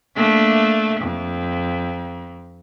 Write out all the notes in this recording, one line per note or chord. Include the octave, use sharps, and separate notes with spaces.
A3 A#3 D4
F2